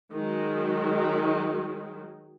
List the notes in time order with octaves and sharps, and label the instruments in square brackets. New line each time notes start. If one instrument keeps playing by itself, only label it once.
[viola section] D#3 F#3 G#3